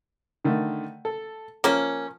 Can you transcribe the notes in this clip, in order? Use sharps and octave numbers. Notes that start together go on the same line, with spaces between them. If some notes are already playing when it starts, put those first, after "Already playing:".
D3 D#3 A3
A4
F3 A#3 C#4